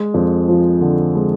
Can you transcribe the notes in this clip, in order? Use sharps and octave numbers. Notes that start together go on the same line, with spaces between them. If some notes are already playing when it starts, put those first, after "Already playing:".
Already playing: G#3
F2
F3
D3
G#3